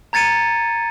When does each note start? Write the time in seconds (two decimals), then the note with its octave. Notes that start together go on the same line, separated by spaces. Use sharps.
0.13 A#5 G#6 A6 C#7 D#7